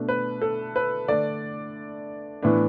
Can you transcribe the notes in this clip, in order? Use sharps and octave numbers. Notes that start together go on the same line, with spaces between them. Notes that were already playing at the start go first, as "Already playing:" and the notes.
Already playing: B2 A3 D4
B4
A4
B4
D3 A3 D4 D5
A2 E3 B3 D4